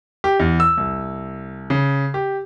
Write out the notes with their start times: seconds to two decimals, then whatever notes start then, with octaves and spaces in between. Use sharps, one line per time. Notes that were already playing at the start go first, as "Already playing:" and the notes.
0.24 G4
0.40 E2
0.60 E6
0.78 C2
1.70 C#3
2.14 G4